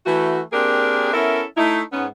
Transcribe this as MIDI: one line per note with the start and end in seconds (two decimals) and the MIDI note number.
0.06 0.40 52
0.06 0.40 57
0.06 0.40 66
0.53 1.11 58
0.53 1.11 60
0.53 1.11 62
0.53 1.11 67
0.53 1.11 68
0.53 1.11 70
1.14 1.43 59
1.14 1.43 61
1.14 1.43 64
1.14 1.43 69
1.14 1.43 70
1.14 1.43 76
1.57 1.82 57
1.57 1.82 63
1.57 1.82 64
1.93 2.06 44
1.93 2.06 59
1.93 2.06 61